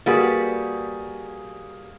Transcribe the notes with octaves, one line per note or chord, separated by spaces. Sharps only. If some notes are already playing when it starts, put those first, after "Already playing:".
G3 A#3 F#4 G#4 B4